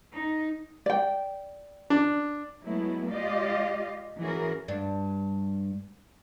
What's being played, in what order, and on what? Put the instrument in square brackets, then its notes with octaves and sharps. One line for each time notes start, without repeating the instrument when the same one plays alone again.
[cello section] D#4
[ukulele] D5 G5
[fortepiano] D4
[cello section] F#3 G#3 A3 B3 E4
G#3 F4 G4 D5 D#5 F5
E3 C#4 F#4 G#4 A#4
[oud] G2 D4